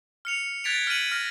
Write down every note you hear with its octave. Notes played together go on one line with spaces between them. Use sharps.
F6 C#7 F7
F#6 G#6 A6 B6 D7 F7
F6 C#7 D#7 F#7
F6 A6 A#6